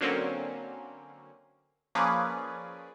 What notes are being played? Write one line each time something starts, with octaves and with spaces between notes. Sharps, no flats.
D3 F#3 A#3 C4 C#4
F3 A#3 C#4 G#4 B4 D5